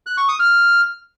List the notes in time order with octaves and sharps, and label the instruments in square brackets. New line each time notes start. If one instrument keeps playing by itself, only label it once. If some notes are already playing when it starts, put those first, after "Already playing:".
[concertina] F#6
C#6
D#6
F6